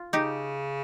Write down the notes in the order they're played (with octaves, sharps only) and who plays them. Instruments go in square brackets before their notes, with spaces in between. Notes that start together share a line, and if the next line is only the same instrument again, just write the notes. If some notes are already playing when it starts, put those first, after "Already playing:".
Already playing: [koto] F4
[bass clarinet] C#3 [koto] D#4 G4